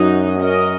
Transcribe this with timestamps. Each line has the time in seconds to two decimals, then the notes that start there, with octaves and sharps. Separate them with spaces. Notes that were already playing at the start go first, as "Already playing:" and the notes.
Already playing: F#2 F#3 D#4 F#4 D#5
0.40 C#4 A#4 D#5